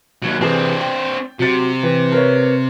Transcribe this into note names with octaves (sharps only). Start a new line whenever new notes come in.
D#2 F#3
C2 E3 C4 D4 G#4
G5
C3 F#3 A6
E3
A#4 B4 C#5